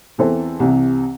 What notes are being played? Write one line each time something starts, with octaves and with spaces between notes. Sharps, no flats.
E2 E3 C4 A4 C5
C2 C3 E3